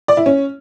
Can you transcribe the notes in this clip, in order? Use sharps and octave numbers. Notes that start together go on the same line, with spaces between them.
D5
E4
C#4